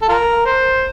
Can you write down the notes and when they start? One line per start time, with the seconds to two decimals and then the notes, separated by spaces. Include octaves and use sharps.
0.02 A4
0.09 F4 A#4
0.46 C5